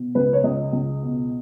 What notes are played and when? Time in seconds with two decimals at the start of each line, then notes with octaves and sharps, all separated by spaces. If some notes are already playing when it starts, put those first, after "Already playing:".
Already playing: B2
0.15 C#2 B4
0.33 C#5
0.44 C#2 D#5
0.73 C#2
1.02 B2